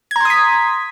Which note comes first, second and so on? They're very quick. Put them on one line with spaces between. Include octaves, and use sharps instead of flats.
G#6 A#5 C6 D#6 B6